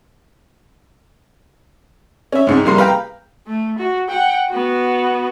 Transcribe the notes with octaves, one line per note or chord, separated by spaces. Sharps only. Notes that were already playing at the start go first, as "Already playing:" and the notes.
C#4 E5
C2 G#2
F2 C3 G3 A#3 C6
B4 F5 G5 A#5
A3
F#4
F#5 G5
B3 F#4